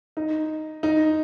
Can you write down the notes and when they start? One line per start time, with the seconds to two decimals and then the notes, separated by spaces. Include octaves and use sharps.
0.17 D#4
0.83 D#4